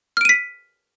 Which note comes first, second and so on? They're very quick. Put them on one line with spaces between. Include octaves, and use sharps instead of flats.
F6 D7 D#7 B6